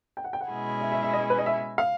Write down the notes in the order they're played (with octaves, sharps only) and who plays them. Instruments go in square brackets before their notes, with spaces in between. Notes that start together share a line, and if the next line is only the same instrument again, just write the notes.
[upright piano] G5
F#5
G5
F#5
[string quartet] B2 G#3 C#4 E4 G#4
[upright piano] E5
E5
E5
D#5
B4
D#5
E5
F5